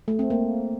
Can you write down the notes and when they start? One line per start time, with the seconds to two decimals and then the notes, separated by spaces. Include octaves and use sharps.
0.08 A3
0.19 C4
0.30 A#3